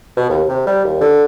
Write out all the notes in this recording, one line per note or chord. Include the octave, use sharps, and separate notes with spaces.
B2
D#2
C3
G3
D#2
D3